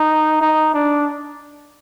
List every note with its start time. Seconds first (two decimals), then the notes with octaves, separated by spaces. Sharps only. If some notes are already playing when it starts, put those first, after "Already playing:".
Already playing: D#4
0.41 D#4
0.74 D4